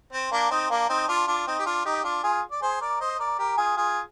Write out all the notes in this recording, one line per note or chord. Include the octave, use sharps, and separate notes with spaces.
C4
A#3 D4
C4 D#4
A#3 D4
C4 D#4
D4 F4
D4 F4
C4 D#4
G4
D4 F4
D#4 G4
D4 F4
F4 G#4
D5
G#4 C5
A#4 D5
C5 D#5
A#4 D5
G4 A#4
F4 G#4
F4 G#4